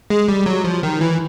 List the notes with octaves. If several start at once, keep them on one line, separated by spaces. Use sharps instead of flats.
G#3
G3
F#3
F3
D#3
E3